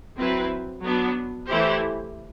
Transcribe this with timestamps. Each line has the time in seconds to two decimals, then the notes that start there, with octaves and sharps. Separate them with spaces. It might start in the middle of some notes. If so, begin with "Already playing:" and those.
0.18 F#3 C4 E4 B4
0.83 F#3 B3 D4
1.49 E3 A3 E4 G4 C5